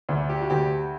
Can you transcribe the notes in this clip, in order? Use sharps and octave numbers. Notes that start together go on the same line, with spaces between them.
D2 D4
G4
F#4
D2 G4